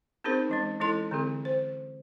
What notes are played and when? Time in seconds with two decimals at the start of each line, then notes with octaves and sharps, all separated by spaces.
0.24 C4 C#4 D#4 G#4 A#4 C5
0.49 E3 G#3 C#4
0.80 E3 G#3 C#4 E4 A4 C6
1.11 D3 E3 C4 G#4
1.45 C5